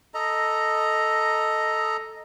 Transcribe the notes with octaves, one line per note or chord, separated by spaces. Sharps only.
A4 D#5 A#5